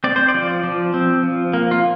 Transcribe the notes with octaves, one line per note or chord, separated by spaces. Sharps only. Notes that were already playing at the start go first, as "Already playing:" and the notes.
C4 D5
C5
D5
F3
F3
C4
F3
A#3
F4